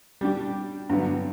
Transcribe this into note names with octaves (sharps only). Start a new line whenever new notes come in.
G3 D4 G4
G2 D3 F#3 B3